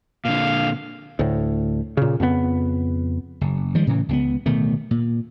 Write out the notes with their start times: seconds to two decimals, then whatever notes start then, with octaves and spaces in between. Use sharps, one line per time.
0.25 A#2 D3 F5
1.19 D2 A2
1.97 A#2 C#3
2.20 F2 C#3 F3 B3
3.41 F#1
3.75 D#3 F3 G3 G#3
3.87 A2 C#3 E3
4.09 C#2 A#3 B3
4.46 D1 B2 D#3 A3
4.91 A#2